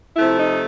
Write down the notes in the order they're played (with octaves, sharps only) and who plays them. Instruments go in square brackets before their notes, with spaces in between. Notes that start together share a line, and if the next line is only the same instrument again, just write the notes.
[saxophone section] C3 F3 A3 E4
D#4